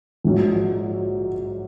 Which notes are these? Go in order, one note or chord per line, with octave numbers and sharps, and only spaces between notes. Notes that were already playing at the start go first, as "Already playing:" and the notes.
A#1 G#2 F#3